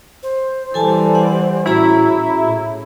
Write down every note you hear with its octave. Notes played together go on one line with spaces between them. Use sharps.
C5
E3 G3 A4 G#5 A5
F#5
A2 C#4 E4 F#4 G#4 A#5
A2